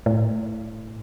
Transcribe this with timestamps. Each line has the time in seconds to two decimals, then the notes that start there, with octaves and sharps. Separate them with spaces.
0.06 A2